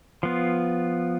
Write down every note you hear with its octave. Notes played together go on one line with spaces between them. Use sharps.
F3 B3 F4